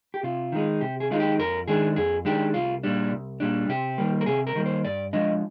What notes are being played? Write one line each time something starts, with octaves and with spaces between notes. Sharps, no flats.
G4
C3 F4
D#3 G#3 D#4
C3 G4
G#4
D#3 G#3 D#4 F4
G4
F2 A#4
D#3 G#3 D4 G#4
F2 G#4
D#3 G#3 D4 G4
C2 F4
A#2 G3 D4
C2
A#2 G3 D4
C3 G4
D#3 G3 A#3
A#4
C3 G#4
A#4
D#3 G3 A#3
C5
G2 D5
F3 G#3 D4 D#5